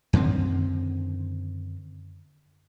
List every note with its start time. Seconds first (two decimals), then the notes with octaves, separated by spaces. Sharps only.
0.13 F#2 D3 D#3 C4